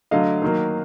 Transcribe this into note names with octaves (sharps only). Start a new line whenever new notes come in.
D3 F#3 A3 D#5 F5
D#3 F#3 A#3